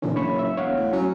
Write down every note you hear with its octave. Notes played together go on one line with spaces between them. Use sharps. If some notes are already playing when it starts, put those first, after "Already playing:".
A#2 D3 E3 C#4
F#1 C#5 B5 C#6
E5
E1 C#5 F5 F#5
A2
F#3 C#4